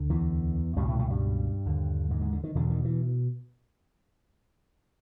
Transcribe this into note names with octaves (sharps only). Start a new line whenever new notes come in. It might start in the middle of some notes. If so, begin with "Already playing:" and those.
Already playing: D2 D3
E2 E3
C#2 G2 B2 G3
A2 A3
A2 A3
G2 G3
D#2 D3
G#2 G#3
G#2 G#3
D3
D#3
E2 B2 D3
D#3
E3